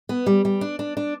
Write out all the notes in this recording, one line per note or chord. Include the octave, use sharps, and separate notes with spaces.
B3
G3
G3
D4
D4
D4